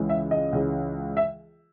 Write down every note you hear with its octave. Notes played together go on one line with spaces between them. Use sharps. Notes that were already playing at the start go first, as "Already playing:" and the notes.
Already playing: C#2 C#3 E3 G#3
E5
D#5
C#2 C#3 E3 G#3
E5